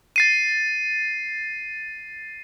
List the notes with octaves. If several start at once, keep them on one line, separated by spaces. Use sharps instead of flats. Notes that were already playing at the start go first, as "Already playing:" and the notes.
A6 C7 D#7